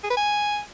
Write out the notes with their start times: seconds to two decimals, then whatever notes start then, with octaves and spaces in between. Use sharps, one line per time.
0.04 G#4
0.10 B4
0.17 G#5